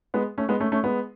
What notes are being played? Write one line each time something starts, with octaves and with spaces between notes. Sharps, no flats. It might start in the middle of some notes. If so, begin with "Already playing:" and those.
G#3 B3
A3 C#4
G#3 B3
A3 C#4
A3 C#4
G#3 B3